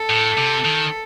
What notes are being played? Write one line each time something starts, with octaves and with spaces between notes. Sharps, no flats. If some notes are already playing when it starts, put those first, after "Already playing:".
Already playing: A4
A2
C3
D#3